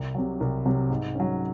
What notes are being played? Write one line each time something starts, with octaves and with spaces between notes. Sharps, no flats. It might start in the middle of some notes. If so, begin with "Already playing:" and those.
Already playing: C2
C3 F#3
C2
C3 F#3
G#2
F#3 C#4